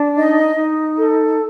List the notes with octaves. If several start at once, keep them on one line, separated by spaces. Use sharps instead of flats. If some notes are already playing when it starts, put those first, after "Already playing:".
Already playing: D4
D#4 D#5
D#4
A4